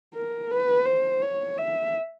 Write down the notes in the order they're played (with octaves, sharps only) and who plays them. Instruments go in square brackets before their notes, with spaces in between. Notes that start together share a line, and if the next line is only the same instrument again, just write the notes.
[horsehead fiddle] A#4
B4
C5
C#5
E5